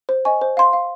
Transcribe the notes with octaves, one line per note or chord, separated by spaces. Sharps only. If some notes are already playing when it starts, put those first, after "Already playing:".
C5
D#5 G#5 C#6
C5
F5 C6
F5